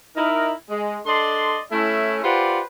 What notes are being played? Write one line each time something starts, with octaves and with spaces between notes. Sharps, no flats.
D#4 E4 A#4
G#3
D4 A4 D5 D#5 C6
A3 C#4 E4
F4 G4 B4 C5 D5 F#5